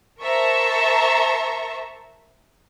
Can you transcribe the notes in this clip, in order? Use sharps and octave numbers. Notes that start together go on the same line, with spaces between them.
A#4 C5 E5 A5 A#5 C#6